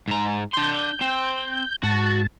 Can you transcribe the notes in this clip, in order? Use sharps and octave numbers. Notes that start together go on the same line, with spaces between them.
G#2 A#5
D4 C6 G6
C4
G#2 F#4 A5